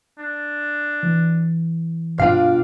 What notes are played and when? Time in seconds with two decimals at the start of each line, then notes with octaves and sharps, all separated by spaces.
0.18 D4
1.03 E3
2.20 G2 B2 D4 F4 F5 D6